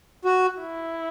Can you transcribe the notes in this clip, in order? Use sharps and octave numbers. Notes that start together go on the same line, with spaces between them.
F#4
E4